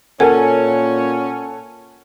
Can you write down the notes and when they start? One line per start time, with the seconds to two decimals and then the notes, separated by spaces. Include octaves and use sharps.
0.20 A#2 C#4 A4 A#4 F#5 G#5